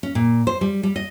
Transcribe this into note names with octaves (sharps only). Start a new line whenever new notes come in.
C#4
A#2
C5
G3
G3
D#5